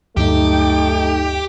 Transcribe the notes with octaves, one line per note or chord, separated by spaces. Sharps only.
D2 G2 F#3 A3 D#4 G4